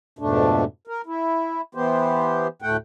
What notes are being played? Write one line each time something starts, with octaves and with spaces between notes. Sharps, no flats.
F2 G#2 B2 A3 D4
A#4
E4
E3 B3 G4 C5
D2 A2 A3 F#5 G5